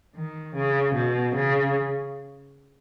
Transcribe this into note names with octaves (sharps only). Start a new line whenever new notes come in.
D#3
C#3
B2
C#3